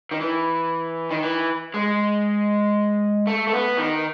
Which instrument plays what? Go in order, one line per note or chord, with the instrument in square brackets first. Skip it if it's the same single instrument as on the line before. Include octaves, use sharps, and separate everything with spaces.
[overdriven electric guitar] D#3
E3
D#3
E3
G#3
A3
A3
B3
D#3